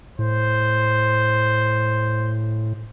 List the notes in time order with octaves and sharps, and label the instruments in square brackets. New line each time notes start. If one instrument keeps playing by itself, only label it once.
[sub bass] A2 [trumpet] C5